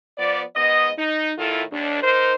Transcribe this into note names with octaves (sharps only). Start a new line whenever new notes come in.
F3 B3 D5
G#2 B3 D#5
D#4
A2 D#3 E4 F4 A4
D#2 D4
D#4 A#4 C5